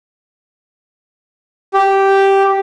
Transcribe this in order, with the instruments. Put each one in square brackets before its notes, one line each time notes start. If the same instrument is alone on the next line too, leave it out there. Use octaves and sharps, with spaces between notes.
[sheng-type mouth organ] G4